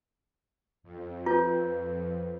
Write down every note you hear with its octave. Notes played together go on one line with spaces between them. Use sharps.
F2
F4 B4 G6